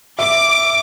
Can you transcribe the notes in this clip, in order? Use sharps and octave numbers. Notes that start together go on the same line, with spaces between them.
E5 D6